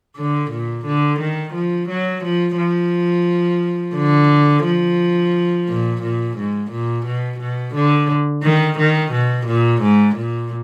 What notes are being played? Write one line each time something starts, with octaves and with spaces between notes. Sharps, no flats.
D3
A#2
D3
D#3
F3
F#3
F3
F3
D3
F3
A#2
A#2
G#2
A#2
B2
B2
D3
D#3
D#3
B2
A#2
G#2
A#2